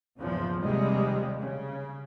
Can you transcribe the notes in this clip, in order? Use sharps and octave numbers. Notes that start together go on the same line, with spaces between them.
A#1 E2 G#2 C#3 F3
F1 D#2 C3 G3 G#3
C#3